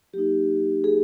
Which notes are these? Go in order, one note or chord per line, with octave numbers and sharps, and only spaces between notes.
F#3 A#3 D#4 G4
G#4